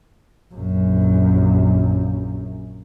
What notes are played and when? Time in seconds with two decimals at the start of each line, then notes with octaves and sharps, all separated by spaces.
0.54 A#1 F#2